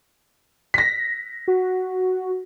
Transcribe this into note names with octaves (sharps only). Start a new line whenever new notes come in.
A#6 B6
F#4